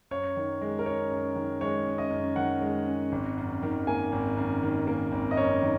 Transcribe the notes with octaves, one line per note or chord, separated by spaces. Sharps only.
F#2 C#5
D#3
G#3
A#4
C#4 C#5
F#2
D#3
G#3 C#5
C#4
D#5
F#2
D#3 F#5
G#3
C#4
G#1
F#2
D#3
A#3 G#5
G#1
F#2
D#3
A#3
G#1
D#5
F#2 C#5
D#3